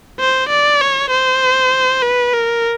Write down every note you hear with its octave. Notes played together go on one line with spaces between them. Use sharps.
C5
D5
C#5
C5
B4
A#4